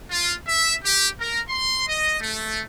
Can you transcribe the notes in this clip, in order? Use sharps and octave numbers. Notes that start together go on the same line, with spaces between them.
F4
E5
G4
A#4
C6
D#5
A3